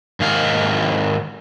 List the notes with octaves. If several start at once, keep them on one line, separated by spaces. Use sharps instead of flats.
G#2 D#3 F5